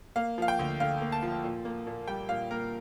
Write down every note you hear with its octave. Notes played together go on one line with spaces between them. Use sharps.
A#3 F5
F3 F5
G5
D2
D3 F5
A#3
A5
F3
A#2
A#3
A#2
G3 G5
A#2 F5
A#3 A#4